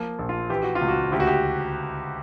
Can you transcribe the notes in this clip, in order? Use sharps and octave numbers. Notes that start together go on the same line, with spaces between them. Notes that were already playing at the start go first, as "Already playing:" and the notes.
Already playing: F3 A#3
A#1
F4
E3 G4
F#4
F4
C#2
F#4
D2 G4
F#4
G4